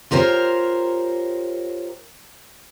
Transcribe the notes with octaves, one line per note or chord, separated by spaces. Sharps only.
F4 G4 A#4 C5 C#5